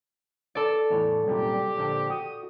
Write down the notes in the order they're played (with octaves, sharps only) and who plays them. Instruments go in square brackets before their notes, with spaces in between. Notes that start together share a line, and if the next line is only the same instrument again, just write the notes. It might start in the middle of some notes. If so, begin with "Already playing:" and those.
[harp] A4 D5
[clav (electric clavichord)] E2 A2 C#5
[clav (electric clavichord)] C2 F#2 A#2 [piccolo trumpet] G4
[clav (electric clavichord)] A#1 D3 A5
[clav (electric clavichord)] F#4 [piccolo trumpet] D#6